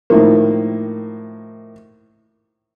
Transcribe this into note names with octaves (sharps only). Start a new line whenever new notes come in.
A2 D#3 F3 A#3